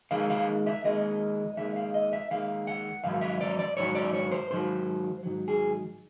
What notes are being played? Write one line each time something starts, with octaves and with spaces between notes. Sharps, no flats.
D#2 D#3 G#3 F5
F5
E5
D#2 D#3 G#3 D#5
D#2 D#3 G#3 E5
F5
D#5
E5
D#2 D#3 G#3 F5
F#5
G#2 D#3 F#3 F5
E5
D5
D5
G#2 D#3 F#3 C#5
D5
C#5
C5
G#2 D#3 F#3 C5
G#2 D#3 F#3
G#4